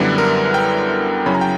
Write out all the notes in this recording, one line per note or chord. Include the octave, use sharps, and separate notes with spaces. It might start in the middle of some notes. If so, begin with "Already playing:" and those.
Already playing: F#2 D3 G3 B3 E4 B4
A#4
G5
F#2 C#3 F#3 C#4 E4 B5
A#5
G5